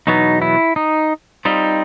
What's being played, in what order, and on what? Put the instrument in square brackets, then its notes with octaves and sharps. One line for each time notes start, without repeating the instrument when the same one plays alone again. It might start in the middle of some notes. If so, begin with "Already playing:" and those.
[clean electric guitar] E2 B2 F#3 B3 [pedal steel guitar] D#4
[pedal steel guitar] E4
D#4
[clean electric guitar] G3 C4 F4 [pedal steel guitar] D#4